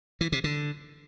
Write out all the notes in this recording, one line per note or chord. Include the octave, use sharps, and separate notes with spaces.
E3
C3
D3